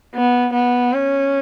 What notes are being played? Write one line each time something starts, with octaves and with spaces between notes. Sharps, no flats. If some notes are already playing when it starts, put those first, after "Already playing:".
B3
B3
C#4